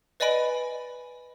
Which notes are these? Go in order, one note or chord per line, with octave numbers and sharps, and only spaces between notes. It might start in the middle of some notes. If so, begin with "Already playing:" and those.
B4 D5 D#5 G#5 B5 D7